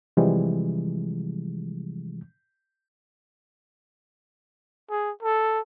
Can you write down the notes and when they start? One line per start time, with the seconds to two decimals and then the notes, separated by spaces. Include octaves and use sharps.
0.17 C3 E3 F3 G3 G#3
4.90 G#4
5.22 A4